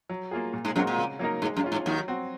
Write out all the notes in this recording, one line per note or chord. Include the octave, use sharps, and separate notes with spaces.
F#3
A#3 F4 G#4
A#2
G#2 G#3
F#2 F#3 G#3 C4 F#4 A#4
A#2
C#3
F#3 A#3 D#4 A#4
G#2 G#3
F#2
C#4 F4
G#2
D#2 D#3 F#3
C4 F#4